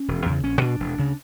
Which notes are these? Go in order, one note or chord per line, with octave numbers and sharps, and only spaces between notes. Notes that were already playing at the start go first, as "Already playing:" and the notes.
Already playing: C#4
E1
E2 C#3
A#1 C#4
A#2 D4
E1
D2 C#3